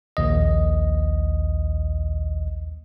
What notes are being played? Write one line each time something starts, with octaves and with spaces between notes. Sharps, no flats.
A#1 D#2 D#5